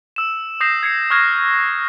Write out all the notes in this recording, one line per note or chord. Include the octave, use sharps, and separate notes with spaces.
E6 E7
D#6 G6 A#6 C7 E7
G#6 C7 C#7
C#6 D#6 F6 F#6 G#6 A#6